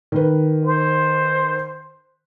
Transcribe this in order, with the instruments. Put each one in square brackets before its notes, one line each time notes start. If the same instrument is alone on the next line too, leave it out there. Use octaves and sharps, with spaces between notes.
[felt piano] D#3 B4
[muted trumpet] C5